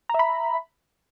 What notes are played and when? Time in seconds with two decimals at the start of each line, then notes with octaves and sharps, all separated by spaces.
0.09 A#5
0.14 E5
0.19 B5